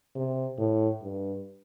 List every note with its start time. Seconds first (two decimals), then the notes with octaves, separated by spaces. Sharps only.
0.15 C3
0.58 A2
1.02 G2